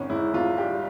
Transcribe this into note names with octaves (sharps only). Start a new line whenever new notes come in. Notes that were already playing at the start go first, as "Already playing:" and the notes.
Already playing: G#1 C#4
G#2 E4
G#1 F4
G3 G4